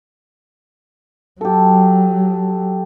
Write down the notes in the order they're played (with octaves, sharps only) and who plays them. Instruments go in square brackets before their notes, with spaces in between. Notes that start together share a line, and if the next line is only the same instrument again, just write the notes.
[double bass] F#3 [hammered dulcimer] G4 A4